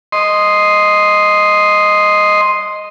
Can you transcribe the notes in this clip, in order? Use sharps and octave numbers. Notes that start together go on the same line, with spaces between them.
D#5 C6